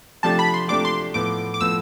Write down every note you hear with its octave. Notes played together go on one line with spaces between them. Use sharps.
C3 F3 A3 D4 G4 A5
B5
C6
C3 F3 A3 D4 G4 D6
C6
A2 F3 B3 D6
D6
A2 F3 B3 E6